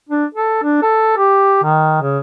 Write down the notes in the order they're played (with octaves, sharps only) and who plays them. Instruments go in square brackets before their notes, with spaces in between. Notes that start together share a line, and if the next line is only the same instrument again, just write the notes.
[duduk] D4
A4
D4
A4
G4
D#3
C#3